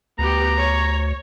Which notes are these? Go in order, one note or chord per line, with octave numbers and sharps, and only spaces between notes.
D2 B3 G4 A#5
C#5